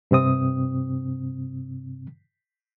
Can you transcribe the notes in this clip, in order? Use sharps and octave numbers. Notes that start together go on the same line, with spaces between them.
G2 C3 C4 D#6